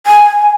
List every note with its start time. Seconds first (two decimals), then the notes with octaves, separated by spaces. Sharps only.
0.07 G#5